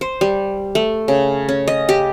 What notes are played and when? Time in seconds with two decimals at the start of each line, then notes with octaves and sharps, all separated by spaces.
0.01 C5
0.21 G3
0.75 A3
1.08 C#3
1.49 C#4
1.68 D#5
1.89 G4